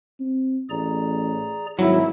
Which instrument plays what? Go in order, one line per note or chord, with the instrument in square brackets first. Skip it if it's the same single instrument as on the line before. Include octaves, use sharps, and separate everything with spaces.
[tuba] C4
[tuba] A1 [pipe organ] G#4 D5 A#5
[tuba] G#1 [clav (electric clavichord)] F#3 [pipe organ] G3 [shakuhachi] E4